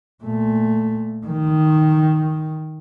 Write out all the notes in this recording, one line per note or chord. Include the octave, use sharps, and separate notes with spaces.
A#2 A3
D#3